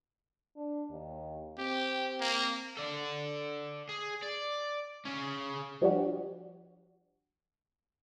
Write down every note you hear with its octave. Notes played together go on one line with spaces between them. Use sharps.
D4
D#2
C4 G4
A#3
A4 D5
G#4
D5
C#3 C#4
F3 G3 D4 F#4 G4